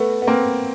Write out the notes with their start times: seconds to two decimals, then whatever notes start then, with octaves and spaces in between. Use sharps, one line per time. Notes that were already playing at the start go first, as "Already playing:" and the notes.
Already playing: A3 B3
0.22 B3
0.27 A#3 C4